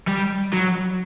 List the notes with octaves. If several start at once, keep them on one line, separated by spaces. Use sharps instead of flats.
G3
F#3